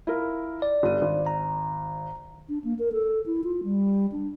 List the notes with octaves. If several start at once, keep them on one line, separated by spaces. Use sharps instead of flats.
E4 F4 A#4
D5
G1 D#7
G#1
A#5
D4
A#3
A#4
A4
E4
F4
G3
D4